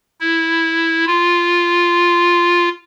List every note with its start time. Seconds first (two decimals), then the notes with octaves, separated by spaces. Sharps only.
0.20 E4
1.06 F4